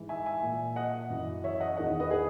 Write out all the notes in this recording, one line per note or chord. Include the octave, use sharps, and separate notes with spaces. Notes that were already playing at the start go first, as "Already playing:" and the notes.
Already playing: G#2 E3
E5 G#5
E5 G#5
A#2
D#5 F#5
F#2 E3
C#5 E5
D#5 F#5
E2 D#3 D#5 F#5
B4 D#5
G#4 B4